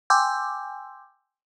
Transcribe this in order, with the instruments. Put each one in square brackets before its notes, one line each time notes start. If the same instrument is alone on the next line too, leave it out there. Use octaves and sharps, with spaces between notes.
[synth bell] G5 G#5 C6 D6 E6 G6